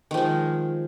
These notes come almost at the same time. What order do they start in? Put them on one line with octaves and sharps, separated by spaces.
D#3 F3 G#3